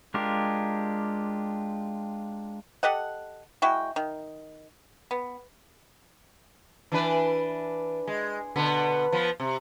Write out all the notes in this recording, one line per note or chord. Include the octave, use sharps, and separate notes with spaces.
G#3 D4 F4 G4 A#4
G4 A4 D#5 F#5
G#3 E4 F#4 G5
D#3
B3
E3 D4 B4
G#3
B2 D3 B3
F3 B3
C3